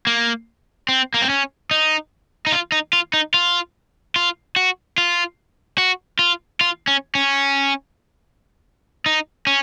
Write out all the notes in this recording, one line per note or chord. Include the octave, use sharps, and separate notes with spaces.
A#3
C4
A#3
C4
C#4
D#4
D#4
F4
D#4
F4
D#4
F4
F4
F#4
F4
F#4
F4
F4
C#4
C#4
D#4
C#4